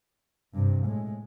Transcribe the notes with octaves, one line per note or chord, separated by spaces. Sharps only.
G2 C3
A2 G#3